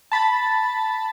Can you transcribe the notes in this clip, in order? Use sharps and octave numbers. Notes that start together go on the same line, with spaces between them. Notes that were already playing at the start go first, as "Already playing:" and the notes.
A5 B5 A6